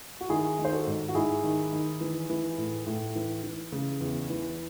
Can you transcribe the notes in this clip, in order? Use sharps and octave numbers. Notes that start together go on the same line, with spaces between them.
F#4
D#3 E4 G#4
D#3
C5
F#4 A4
G#2
F#4
G#2 E4 G#4
D#3
D#3
E3
E3
A2
A2
E3
E3
C#3
E2
E3